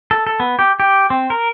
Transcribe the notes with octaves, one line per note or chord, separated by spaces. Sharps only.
A4
A4
B3
G4
G4
C4
A#4